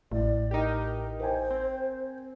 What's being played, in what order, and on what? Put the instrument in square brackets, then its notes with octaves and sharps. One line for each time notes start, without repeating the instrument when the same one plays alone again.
[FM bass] A1 [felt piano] A2 [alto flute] D5
[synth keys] D#4 G4 [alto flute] A#4
[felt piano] A#4 G5 G#5 [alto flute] C5
[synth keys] C4